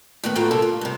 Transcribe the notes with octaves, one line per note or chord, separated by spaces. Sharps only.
A2 D#3 B3
A2 B3 F4 F#4 G5 A#5
G2 C3 A#3 A4 A#4
F4
G2 C3